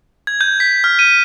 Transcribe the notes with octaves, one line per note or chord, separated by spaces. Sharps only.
G#6
G6
B6
F6
D#7